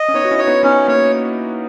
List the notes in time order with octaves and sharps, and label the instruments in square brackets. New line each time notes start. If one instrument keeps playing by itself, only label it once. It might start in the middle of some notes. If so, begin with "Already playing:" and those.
Already playing: [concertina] D#5
[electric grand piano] C#4
[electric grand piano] B3 D#4 [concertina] C#5
[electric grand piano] F#4
C#4 E4
[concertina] C#5
[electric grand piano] B3 D#4
[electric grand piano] B3 D#4 [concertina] C#4
[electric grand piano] A#3 C#4 [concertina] C#5